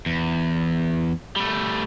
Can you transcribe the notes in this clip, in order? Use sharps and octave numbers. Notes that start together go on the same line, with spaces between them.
E2
G3 A3